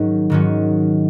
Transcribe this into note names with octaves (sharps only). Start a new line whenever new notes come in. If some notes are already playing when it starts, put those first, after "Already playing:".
Already playing: G#2 D#3 F#3 C#4
G#2 D#3 F#3 C#4